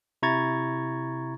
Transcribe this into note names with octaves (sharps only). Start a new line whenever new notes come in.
C3 E4 A#5 C#6 G#6 A6